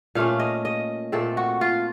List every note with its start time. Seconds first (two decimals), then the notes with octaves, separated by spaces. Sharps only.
0.15 A#2 A3 C#4 F5
0.39 D#5
0.65 D#5
1.12 A#2 A3 C4 A4
1.37 F#4
1.61 F4